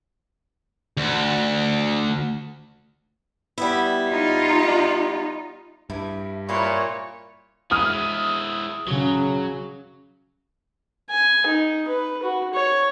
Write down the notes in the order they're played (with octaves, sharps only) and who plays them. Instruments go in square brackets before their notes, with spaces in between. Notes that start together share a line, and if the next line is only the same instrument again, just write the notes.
[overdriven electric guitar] D2
[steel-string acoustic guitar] G3 B3 E4
[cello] D#4 F4
[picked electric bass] G2 [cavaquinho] E4
[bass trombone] A#2 [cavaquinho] E4 B4 C6 [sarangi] C#5
[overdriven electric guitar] G#3 E4 [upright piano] D#6 F6
[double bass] C#3 [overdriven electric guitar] F#3
[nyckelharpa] G#5
D#4
B4
F#4
C#5